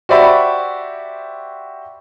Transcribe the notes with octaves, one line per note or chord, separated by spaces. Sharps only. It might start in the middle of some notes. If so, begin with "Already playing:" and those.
F#4 G4 C5 D5 E5 B5